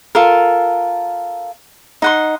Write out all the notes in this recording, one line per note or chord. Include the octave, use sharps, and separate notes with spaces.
F4 A4 A#4
D#4 F#5 C6